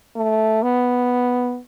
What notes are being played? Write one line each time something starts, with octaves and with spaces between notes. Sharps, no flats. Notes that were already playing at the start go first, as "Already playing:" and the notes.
A3
B3